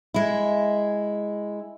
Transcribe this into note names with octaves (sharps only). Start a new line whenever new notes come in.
G#3 E4